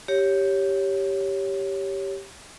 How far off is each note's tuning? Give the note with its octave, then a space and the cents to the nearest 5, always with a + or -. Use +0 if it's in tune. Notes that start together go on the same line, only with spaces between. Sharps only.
G4 +0 C#5 +0